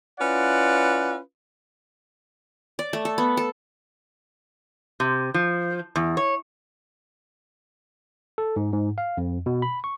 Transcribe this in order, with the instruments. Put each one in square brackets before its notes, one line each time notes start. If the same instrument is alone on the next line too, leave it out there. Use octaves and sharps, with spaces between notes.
[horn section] C#4 E4 F4 B4 D5 F#5
[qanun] D5
A3
A4
B3
A4
[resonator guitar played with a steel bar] C3
F3
E2
C#5
[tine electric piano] A4
G#2
G#2
F5
F2
B2
B5
C#6